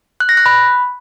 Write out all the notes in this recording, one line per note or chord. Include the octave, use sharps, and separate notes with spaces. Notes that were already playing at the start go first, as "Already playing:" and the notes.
F#6
A#6
F#6
B5